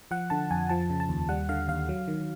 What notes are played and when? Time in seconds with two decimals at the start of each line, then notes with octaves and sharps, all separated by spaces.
0.11 F3 F#5
0.30 D3 A5
0.51 F2 G#5
0.69 F3 A5
0.90 C#3
1.00 A5
1.09 D#2
1.29 G3 F#5
1.49 D3 F5
1.68 D#2 F5
1.89 F#3
2.08 D#3